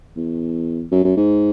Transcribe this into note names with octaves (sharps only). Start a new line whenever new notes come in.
E2
F#2
F#2
G#2